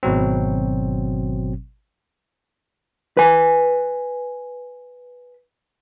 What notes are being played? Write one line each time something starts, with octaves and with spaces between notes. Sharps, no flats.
G#1 B2 F#3 C4
B4 G#5